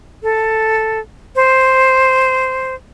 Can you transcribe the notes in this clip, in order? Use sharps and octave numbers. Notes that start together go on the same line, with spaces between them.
A4
C5